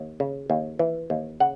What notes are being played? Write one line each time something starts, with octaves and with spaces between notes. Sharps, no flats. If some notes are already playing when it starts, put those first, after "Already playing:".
Already playing: D#2
C#3
D#2
E3
D#2
C#3 F#5